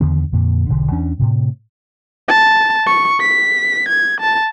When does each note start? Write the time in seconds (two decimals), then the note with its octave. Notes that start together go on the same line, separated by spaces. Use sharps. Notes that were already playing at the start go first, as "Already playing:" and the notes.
0.01 E2 D3 D#3 B3
0.32 F2 A#2 D3
0.69 E1 B1 D3
0.91 E2 E3 C#4 D4
1.19 A2 C3
2.28 A5
2.86 C#6
3.21 B6
3.89 G#6
4.21 A5